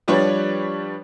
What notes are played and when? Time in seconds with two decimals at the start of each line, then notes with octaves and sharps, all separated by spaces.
0.08 F3 G3 D4 G4 B4 C#5